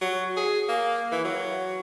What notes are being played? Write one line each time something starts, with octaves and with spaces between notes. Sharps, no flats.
F#3
G#4
A#3
E3
F#3